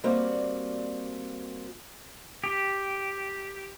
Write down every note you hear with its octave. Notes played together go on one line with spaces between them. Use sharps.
G3 A#3 C4 F#4 D5
G4